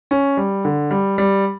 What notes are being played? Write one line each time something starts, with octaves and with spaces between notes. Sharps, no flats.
C#4
G3
D3
G3
G3